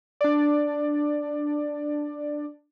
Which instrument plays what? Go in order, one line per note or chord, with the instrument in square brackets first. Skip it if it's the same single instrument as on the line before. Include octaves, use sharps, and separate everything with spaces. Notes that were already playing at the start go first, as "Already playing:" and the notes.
[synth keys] D4 D5